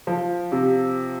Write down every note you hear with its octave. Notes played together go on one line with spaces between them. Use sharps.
F3
C3